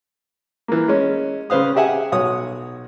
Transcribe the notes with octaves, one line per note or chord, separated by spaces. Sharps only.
E3 A#3
G#3 C#4
C#3 B4 C5 F5 D#6
G4 G#4 E5 F#5 G#5
B1 F#4 C#5 D#6